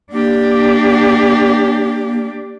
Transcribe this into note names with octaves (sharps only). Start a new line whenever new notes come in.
A#3 D4 G4